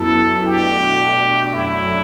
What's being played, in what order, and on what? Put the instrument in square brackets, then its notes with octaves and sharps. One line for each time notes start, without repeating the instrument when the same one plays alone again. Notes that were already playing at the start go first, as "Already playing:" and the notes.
Already playing: [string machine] F#2 F#3 B3 E4 [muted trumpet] A4
[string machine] B2 A3 D4 F#4 [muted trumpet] G4
[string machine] F#2 F#3 A3 D4 F#4 [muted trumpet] E4